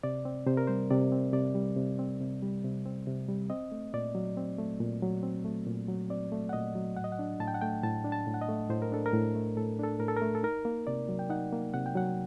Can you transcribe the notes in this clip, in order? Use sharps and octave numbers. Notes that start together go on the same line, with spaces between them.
C3 D5
C4
C3 C5
A#4
G3 C5
C3 D5
C4
C3 D5
G3
C3
C4
C3
G3
C3
C4
C3
G3
C4 D#5
A3
A#2 D5
F#3
C4
A3
A#2
F#3
C4
A3
A#2
F#3
C4 D5
A3
F#5
A#2 D#5
F#3
A2 F#5
D#5
F#5
D4
A2 A5
G5
F#5
A3 G5
A2 A5
D4
A5
A2
F#5
D#5
A3
A2 C5
A#4
D4 A4
A#4
A2
A3
A2 A4
D4 A4
A2 A#4
A4
A#4
A3
A4
D#4 A#4
A#3
C3 D5
F#3
G5
D#4 F#5
A#3
C3 F#5
G5
F#3 F#5